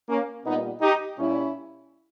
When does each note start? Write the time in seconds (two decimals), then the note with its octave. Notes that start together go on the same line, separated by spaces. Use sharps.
0.09 A#3 C#4
0.45 A#2 G3 B3 D#4
0.81 D#4 G4
1.18 A#2 G3 C#4 E4